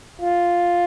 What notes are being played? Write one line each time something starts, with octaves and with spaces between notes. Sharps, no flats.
F4